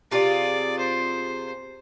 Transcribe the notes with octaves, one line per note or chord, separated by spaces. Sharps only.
C3 F4 G#4 D5
C5